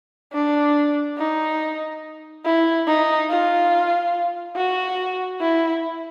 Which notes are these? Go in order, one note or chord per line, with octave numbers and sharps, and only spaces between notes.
D4
D#4
E4
D#4
F4
F#4
E4